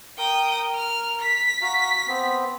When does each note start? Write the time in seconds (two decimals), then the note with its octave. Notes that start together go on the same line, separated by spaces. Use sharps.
0.18 A#4 G5 D#6
0.75 F6
1.21 B6
1.62 F#4 F5 A#5
2.07 B3 C4